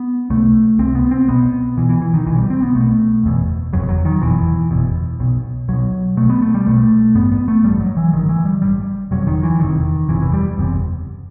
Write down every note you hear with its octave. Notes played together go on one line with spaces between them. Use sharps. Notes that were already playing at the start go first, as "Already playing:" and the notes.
Already playing: B3
C2 C3 A3
C2 C3 C4
B3
C4
B1 B2 B3
B1 B2 E3
E3
E3
D#3
B1 B2 E3
G3
C4
B3
B1 B2 A3
F#1 E2 B2
F#1 E2 B2 F#3
F#3
D#3
F#1 E2 B2 E3
F#1 E2 B2
B1 B2
B1 B2 F#3
B1 B2 A3
B3
A3
G3
B1 B2 A3
A1 G2 B3
B3
A3
A1 G2 G3
F#3
E3
A1 G2 D#3
E3
G3
A1 G2 G3
F#1 E2 C3 F#3
D#3
E3
F#1 E2 C3 D#3
F#1 E2 C3 E3
E3
G3
F#1 E2 C3